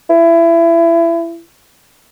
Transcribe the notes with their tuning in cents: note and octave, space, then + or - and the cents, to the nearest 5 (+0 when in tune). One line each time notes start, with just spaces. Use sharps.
E4 +25